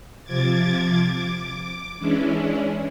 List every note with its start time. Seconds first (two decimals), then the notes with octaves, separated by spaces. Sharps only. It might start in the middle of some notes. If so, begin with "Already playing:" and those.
0.24 C3 F3 D6 G#6 A6
1.08 D6
1.99 E3 G#3 C#4 D4 E4